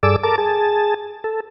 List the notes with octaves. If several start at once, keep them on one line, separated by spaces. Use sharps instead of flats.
G2 G#4 A4 D5 D6 E6
A4 A#4 A5 D6
G#4 A5
A4